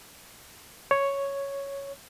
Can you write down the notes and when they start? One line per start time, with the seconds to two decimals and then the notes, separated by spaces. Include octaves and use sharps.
0.91 C#5